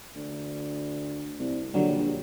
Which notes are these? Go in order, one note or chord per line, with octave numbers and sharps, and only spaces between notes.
D2
C2
A#1 D3 F#3 G3